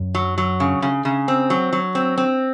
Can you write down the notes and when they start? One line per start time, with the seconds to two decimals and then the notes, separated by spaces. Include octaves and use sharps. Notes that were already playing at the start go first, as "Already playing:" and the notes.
Already playing: F#2
0.15 F#3
0.38 F#3
0.60 C#3
0.82 C#3
1.05 C#3
1.28 C4
1.50 F#3
1.73 F#3
1.95 C4
2.18 C4